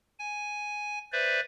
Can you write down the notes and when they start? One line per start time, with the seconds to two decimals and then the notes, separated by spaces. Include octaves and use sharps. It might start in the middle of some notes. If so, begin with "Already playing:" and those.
0.19 G#5
1.13 B4 C5 D5 E5